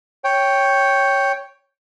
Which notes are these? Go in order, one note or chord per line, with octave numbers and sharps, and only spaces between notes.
C#5 G5